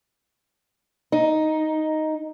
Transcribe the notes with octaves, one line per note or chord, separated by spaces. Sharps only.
D#4